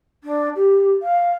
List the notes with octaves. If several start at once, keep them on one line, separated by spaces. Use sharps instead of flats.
D4
G4
F5